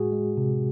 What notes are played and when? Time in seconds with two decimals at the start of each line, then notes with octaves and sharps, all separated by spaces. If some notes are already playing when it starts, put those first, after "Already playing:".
Already playing: A2 G#3 F#4 G#4
0.12 G#3
0.37 C3